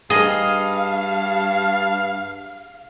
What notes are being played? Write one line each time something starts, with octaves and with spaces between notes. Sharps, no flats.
G2 G#4 D#5 F5